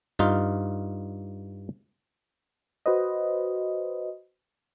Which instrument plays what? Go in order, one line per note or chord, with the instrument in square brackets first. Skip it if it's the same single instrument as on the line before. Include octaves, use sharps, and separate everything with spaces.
[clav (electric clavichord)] G2 D#4 F4
[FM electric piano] F#4 B4 C5 D#5